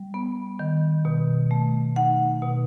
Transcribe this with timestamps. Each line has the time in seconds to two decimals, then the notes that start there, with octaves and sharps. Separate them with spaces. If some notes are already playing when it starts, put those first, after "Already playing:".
Already playing: G3
0.14 B3
0.59 D#3
1.05 B2
1.51 A3
1.96 D#4 F#5
2.42 B2